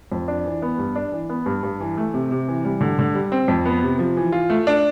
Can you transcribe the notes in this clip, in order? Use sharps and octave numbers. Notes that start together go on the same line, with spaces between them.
F2
D4
E3
B3
G2
D4
E3
B3
G2
G2
E3
A3
C3
C3
E3
G3
D3
D3
G3
C4
F2
B3
C3
F3
E3
F4
A3
D4